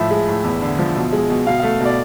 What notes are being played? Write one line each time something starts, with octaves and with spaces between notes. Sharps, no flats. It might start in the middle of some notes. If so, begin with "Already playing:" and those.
Already playing: A2 F3 E5
G#3
A2
E2
D3
F3
B2
G#3
B2
B2 F5
A3 F5
B2 D5